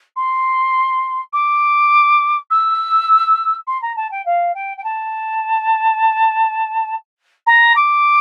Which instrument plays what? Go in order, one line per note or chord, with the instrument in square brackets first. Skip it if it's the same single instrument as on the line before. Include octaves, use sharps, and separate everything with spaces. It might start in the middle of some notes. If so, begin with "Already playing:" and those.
[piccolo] C6
D6
E6
C6
A#5
A5
G5
F5
G5
G5
A5
A#5
D6